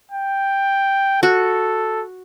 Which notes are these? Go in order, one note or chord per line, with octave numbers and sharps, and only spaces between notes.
G5
F#4 A4